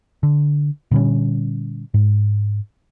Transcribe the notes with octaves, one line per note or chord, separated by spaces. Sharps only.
D3
A#2 D3 G3 C#4
G#2